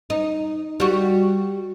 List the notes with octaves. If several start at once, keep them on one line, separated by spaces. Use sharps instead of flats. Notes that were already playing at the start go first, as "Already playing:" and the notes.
D#4
G3 F#4